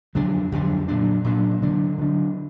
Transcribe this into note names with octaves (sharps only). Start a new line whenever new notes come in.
F2 D3 F#3 D4
F2 D3 F#3 D4
A#2 F#3 D4
A#2 F#3 D4
D3 F#3 D4
D3 F#3 D4